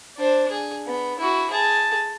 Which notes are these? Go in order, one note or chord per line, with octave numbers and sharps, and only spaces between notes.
D4 C5
G#4
B3
E4 F#4
G#4 A5